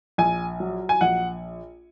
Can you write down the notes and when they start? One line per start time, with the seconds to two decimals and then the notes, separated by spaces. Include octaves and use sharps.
0.18 A#1 G#5
0.60 F#3
0.89 G#5
1.01 A#1 F#5